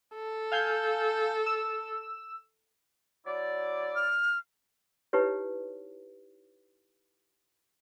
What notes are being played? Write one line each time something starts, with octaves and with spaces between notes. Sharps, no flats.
A4
F5 G#5 G6
E6
F#3 E4 D5
F6
D#4 E4 G4 B4 C#5